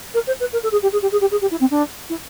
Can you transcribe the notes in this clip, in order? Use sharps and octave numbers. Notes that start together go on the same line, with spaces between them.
A#4
C5
B4
A#4
A4
G#4
G4
G#4
G4
G#4
G4
G#4
G4
E4
C4
D4
E4